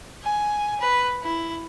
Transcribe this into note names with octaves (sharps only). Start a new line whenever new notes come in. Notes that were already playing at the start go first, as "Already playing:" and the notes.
G#5
B4
E4